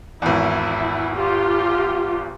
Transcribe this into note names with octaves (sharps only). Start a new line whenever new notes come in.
G#1 E2 E4
F4 G4